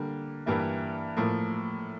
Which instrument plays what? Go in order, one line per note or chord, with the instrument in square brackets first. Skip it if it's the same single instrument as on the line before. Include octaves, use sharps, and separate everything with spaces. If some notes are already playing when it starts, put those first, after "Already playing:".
Already playing: [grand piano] D3 G3 A#3
G2 E3 G3 A#3 E4
A2 F3 A#3